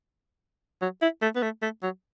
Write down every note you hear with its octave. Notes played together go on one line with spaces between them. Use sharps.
F#3
E4
A3
B3
A3
A3
F#3